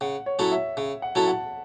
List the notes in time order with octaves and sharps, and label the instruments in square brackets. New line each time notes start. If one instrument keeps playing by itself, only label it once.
[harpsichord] C#3 [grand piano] F#5
[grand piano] C#5
[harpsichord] F#3 C#4 E4 A4
[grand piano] E5
[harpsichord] C#3
[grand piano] F#5
[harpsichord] F#3 C#4 E4 A4 [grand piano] A5
[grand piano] F#5